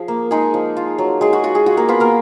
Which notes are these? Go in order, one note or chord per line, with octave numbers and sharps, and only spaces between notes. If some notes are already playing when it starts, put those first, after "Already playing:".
Already playing: F3 G#4
A#3
G#3 D#4 G#4
F3
F4
F#3
F#3 G#3 G#4
F#4
F4 F#4
G#3 G#4
F4 F#4
A#3 A#4
B3 F4 B4
A#3 A#4